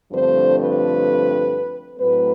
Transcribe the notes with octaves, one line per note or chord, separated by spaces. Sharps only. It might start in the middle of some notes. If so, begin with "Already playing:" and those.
G2 D3 F3 A3 C4 C5
B4
A2 F#3 A3 C4 B4